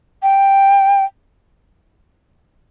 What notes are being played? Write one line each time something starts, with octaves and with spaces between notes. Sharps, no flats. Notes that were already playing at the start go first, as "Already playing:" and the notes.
G5